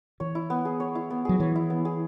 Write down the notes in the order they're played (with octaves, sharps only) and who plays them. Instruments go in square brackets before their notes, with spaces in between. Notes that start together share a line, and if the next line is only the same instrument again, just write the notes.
[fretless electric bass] E3 [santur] C#5
[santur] E4
B3
G#4
C#5
E4
B3
[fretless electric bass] F#3 [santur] G#4
[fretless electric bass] E3 [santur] C#5
[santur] E4
B3
G#4